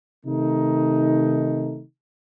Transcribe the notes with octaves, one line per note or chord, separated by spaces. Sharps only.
C3 D#3 A3 D#4